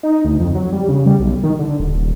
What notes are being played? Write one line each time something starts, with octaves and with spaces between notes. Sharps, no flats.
D#4
D2
F2
F#3
G3
C#3
G3
B1
D#3
D3
D#1